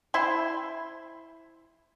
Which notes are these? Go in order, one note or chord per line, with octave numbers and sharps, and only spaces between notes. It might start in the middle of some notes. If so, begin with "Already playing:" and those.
E4 C5 C6